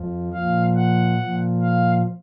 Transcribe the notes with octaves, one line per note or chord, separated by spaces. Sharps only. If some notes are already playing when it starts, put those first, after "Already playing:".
Already playing: F2 F3
A#2 F3 F5
F#5
A#2 F3
F5